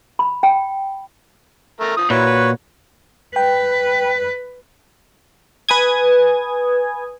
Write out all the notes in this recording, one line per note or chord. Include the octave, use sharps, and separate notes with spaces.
B5
G5
A3 A#4
F3 D#6
A#2 E4 F#4 B4 C#5
B4
B4 G5
B4 G#5 D#6 G#6